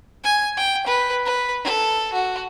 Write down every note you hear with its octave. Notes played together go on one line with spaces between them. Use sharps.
G#5
G5
B4
B4
A4
F#4